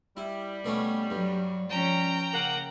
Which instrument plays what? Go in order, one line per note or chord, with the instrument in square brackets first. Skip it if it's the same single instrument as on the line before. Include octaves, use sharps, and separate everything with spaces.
[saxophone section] G3 [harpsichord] E4
[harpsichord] B2 A3 C#4
[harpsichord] G2 [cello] F#3
[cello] F3 C#4 [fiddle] G5 A#5
[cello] C#3 [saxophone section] A#3 F#5